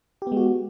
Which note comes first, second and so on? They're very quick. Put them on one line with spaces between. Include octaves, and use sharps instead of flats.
G4 B3 G#3 F#4